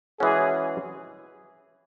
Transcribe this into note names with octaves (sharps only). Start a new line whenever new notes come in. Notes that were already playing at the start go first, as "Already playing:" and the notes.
E3 G#3 C#4 F#4 G#4